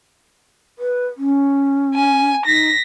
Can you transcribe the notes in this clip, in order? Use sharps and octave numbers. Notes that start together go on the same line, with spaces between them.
B4
C#4
G#5
D#4 A#6 B6